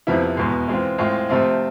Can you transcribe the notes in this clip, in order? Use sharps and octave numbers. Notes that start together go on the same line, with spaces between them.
F2 C3 F3 B3 E4
E2 B2 G#3
E3 G#3 C4 F4
A2 G#3 C4 F4
C3 F3 A3 C4 F4